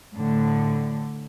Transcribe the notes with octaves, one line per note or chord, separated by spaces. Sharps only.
A2 D3